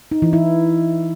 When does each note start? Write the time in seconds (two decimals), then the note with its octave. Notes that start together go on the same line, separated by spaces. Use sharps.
0.12 D#4
0.22 E3
0.33 E4